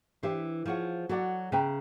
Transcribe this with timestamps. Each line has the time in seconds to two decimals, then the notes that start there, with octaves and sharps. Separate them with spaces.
0.23 E3 D4 G4 C5 E5
0.66 F3 F4 G#4 C#5 F#5
1.09 F#3 F#4 A4 D5 F#5
1.52 C#3 B4 E5 G5 A#5